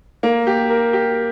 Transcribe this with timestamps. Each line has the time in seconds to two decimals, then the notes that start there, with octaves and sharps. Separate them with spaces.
0.23 A#3
0.47 G4
0.70 A#4
0.93 G4